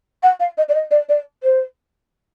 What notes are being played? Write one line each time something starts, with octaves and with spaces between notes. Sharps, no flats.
F#5
F5
D#5
D5
D#5
D5
D5
C5